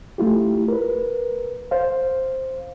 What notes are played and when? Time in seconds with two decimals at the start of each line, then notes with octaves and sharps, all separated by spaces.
0.18 A3 E4 F4 G4
0.68 A#4 B4
1.71 C5 F5